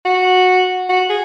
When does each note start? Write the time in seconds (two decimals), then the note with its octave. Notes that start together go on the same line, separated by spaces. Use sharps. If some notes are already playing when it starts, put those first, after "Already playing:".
0.05 F#4
0.89 F#4
1.09 G#4